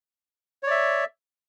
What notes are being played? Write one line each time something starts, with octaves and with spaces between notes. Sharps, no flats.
C#5 D5 E5